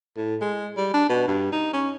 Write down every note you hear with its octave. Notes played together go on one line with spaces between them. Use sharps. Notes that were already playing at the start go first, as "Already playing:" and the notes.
A2
G#3
G3
D4
B2
G2
D#4
C#4